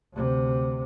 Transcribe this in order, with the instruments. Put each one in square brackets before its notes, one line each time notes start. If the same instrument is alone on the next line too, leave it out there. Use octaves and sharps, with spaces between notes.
[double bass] D2 C3